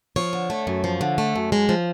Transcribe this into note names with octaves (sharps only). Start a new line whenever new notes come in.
F3 C#5
D3
A3
F#2
F3
D3
A3
F#2
G#3
F3